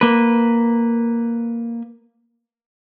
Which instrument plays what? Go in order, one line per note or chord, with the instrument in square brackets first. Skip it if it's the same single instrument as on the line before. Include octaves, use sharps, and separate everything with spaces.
[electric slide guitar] A#3 B4